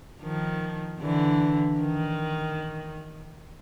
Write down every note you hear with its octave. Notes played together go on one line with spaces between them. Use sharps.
D#3 F3
D3 E3
D#3